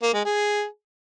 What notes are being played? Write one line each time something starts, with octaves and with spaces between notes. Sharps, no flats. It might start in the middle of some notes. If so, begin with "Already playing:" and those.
A#3
G#3
G#4